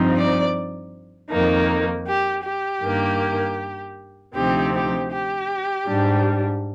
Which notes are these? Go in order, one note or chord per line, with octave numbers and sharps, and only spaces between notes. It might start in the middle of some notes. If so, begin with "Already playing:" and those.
Already playing: G2 F3 C4 D#4
D5
F2 D#3 A#3 D#4
G4
G4
G2 D#3 A#3
D2 C3 F3 C4 D#4 G4
G4
G4
G#2 G3 D4